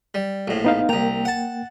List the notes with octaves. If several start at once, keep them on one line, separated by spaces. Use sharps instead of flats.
G3
A#1 A2
B3 D#4 F5
C2 A#3 G5 A#5
F#5 A5